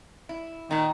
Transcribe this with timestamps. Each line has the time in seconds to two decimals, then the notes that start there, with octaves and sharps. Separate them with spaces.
0.29 E4
0.71 A#2 D#3 D#4